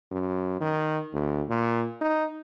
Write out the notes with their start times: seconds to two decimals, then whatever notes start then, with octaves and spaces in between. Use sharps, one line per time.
0.11 F#2
0.60 D#3
1.13 D2
1.49 A#2
2.01 D#4